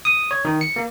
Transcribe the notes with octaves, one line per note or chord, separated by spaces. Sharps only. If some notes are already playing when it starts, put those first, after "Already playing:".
D#6
C#5
D#3
C#7
A#3